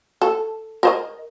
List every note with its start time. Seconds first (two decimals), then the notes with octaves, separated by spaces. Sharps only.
0.22 A4
0.83 A#4 C5 D#5